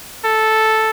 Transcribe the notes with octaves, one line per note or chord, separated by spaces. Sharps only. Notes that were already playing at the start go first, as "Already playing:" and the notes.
A4